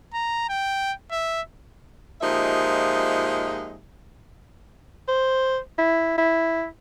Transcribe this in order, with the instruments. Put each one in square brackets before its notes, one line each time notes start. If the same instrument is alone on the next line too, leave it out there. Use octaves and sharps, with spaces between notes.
[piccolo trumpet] A#5
G5
E5
[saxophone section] A#2 F3 G#3 D#4 G4 E5
[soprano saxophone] C5
E4
E4